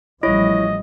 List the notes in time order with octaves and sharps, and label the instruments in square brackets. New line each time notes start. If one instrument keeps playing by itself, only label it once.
[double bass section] A1 F3 G3 [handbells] E4 C#5 [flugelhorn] D#5